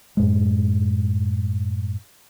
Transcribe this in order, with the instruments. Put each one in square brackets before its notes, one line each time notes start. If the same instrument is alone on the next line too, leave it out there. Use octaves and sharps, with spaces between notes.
[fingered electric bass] F#2 A2 G#3